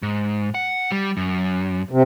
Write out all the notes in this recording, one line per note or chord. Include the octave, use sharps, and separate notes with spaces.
G#2
F#5
G3
F#2
C3